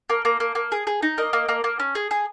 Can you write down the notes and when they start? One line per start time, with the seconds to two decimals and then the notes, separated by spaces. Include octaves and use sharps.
0.10 A#3
0.25 A#3
0.40 A#3
0.55 A#3
0.72 G#4
0.87 G#4
1.03 D#4
1.18 A#3 D#5
1.33 A#3
1.49 A#3
1.64 A#3
1.80 C#4
1.95 G#4
2.11 G#4